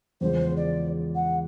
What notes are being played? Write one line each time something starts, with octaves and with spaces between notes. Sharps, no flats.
E2 C#3 F3 G#3 C5
D5
F#5